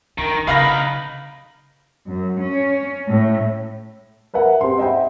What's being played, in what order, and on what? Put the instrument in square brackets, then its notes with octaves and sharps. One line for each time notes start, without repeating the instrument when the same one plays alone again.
[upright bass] E2 [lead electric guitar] D#3
[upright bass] C#3 [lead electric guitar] D#4 B4 [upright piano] F5 F6 A#6 [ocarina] B5
[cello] F#2
C#4
A2
[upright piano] A#4 B4 E5 F#5
C4 G4 C5 C6
D#5 E5 F#5 G5 B5